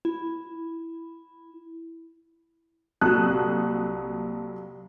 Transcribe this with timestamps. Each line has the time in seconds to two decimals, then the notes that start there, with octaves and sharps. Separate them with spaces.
0.05 E4
3.01 C2 A#2 F#3 A4 D#6 F#6